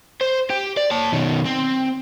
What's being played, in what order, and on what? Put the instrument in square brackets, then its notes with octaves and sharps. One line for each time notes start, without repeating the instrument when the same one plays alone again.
[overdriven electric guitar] C5
G4
D5
C#5 A5
B2 D#3
C4